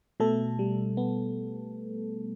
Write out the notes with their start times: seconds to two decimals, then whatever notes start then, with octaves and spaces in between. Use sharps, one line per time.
0.20 B2 A3 A4
0.59 G3
0.97 B3